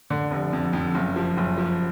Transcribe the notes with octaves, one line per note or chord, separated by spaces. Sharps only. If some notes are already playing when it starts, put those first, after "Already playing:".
D3
F1
F2
F2
F#1
F3
F#1
F3